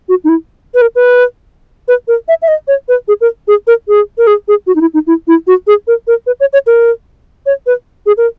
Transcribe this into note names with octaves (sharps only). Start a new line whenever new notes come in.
F#4
D#4
E4
B4
A#4
B4
B4
A#4
E5
E5
D#5
C#5
B4
G#4
A#4
G#4
A#4
G#4
A#4
G#4
G#4
F#4
D#4
E4
D#4
E4
E4
F#4
G#4
A#4
A#4
B4
C#5
C#5
A#4
C#5
B4
G#4
A#4